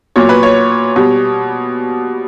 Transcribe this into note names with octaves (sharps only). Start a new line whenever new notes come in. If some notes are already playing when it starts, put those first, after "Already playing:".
A#2 F#3 C#5
B4
C#5
B2 G3